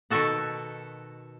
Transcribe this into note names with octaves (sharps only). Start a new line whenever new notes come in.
B2 D#3 F#4 A4 F#5